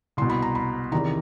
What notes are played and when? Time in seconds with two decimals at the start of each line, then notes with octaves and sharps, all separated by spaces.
0.17 C2 B2 C6
0.30 B5
0.42 A#5
0.55 B5
0.92 E2 C3 D#3 A#5